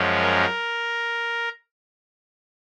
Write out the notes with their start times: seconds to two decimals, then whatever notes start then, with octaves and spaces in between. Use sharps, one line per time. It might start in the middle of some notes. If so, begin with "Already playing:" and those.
Already playing: F#2 F3 G#3 C#4
0.22 A#4